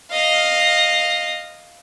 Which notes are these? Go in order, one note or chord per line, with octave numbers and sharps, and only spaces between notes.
D#5 F5